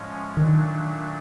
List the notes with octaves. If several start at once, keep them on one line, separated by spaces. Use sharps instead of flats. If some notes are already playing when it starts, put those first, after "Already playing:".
Already playing: A2 F3 G#3 C#4
A#2 D#3 F#3 A3 D4